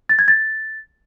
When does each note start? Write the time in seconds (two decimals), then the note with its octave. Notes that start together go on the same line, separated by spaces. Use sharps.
0.09 A6
0.19 G#6
0.28 A6